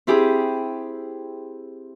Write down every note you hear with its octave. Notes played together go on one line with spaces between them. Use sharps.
C4 E4 G4 G#4